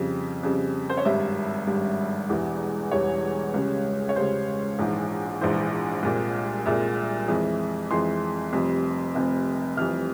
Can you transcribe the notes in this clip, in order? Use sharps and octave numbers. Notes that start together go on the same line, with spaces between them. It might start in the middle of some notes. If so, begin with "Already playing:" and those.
Already playing: F2 C#3 G3
F2 C#3 G3
C5
C#5
G#1 G2 G3 E5
G#1 G2 G3
E1 E2 E3 G3
E1 E2 E3 G3 C#5
C#2 C#3 G3
C#5
C#2 C#3 G3 C5
A#1 G#2 E3
A#1 G#2 E3 C5
C2 A#2 G#3
C2 A#2 G#3 E5
F2 E3 G#3
F2 E3 G#3 C6
F1 F2 C3 G3
F1 F2 C3 G3
F1 F2 E3 G3 F6